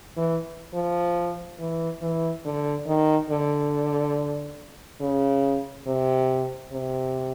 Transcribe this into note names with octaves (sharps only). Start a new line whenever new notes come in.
E3
F3
E3
E3
D3
D#3
D3
C#3
C3
C3